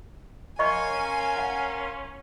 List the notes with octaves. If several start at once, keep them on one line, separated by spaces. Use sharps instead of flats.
A#4 C#5 D#5 F5 G#5 C6 C#6
C#4
F#5